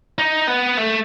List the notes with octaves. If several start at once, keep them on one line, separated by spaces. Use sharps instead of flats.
D#4
B3
A3